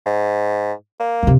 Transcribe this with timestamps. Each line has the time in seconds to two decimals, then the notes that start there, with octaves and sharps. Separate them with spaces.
0.06 G#2
1.00 A#3
1.23 F#2 C3